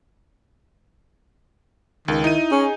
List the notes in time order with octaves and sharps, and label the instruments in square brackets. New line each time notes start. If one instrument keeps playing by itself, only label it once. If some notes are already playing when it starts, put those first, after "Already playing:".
[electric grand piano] C#2 [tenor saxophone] D#3
[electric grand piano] D#4 D#7 [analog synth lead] E4
[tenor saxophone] C#4 [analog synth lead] G#4